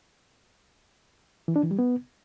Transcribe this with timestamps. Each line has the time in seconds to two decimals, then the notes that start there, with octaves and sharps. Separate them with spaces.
1.48 E3
1.56 D4
1.63 E3
1.71 G3
1.79 B3